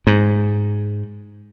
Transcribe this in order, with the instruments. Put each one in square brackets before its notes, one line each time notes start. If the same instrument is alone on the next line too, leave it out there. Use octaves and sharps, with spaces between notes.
[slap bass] G#2